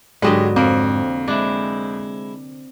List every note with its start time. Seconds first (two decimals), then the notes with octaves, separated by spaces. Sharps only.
0.22 G#2 D3 F#3 G#3 B3 G4
0.56 F2 A#3 C4
1.28 G#3 D4 E4